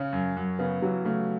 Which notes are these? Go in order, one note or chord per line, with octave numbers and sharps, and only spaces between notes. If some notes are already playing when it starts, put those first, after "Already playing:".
Already playing: C#3 C#4
F#2
F#2
C#3 B3
E3 F#3
C#3 A3